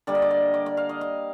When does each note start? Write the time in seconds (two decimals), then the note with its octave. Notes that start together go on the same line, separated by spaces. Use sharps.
0.07 D3 G3 A#3 D5
0.15 D#5
0.22 D5
0.31 D#5
0.54 D5
0.66 D5
0.77 F5
0.89 D#5
1.01 F5